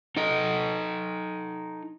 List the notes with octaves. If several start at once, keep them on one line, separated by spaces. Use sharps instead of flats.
D#4 A4 D#5